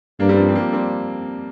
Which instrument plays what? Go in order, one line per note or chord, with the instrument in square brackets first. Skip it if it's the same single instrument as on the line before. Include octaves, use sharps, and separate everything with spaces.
[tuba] G2 [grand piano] A#3 D4
[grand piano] G3 C4
F3 A#3
C4
F3 A#3
G3 C4